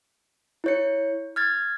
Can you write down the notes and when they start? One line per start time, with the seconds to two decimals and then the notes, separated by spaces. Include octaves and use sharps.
0.64 E4 C#5 C#7
1.36 F6 G#6 A6